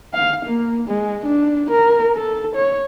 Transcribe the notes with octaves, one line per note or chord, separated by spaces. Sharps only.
F5
A#3
G#3
D4
A#4
A4
C#5